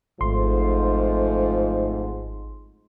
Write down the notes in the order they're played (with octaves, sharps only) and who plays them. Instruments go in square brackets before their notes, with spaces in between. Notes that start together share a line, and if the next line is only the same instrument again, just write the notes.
[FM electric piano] G#1 C6 [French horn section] F2 F3 A3 [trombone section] G#2